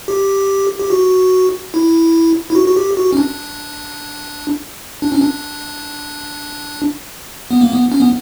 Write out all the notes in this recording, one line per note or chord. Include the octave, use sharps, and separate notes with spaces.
G4
G4
F#4
E4
E4
F#4
F#4
G4
F#4
C#4
D4
D4
C#4
D4
B3
A#3
B3
C#4
B3